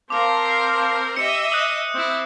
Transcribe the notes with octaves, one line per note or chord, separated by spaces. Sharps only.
C4 A#4 F5 A5 C6 D6
C7
G4 D#5 E5 E6 C#7
C5 D#6 F#6
C4 E4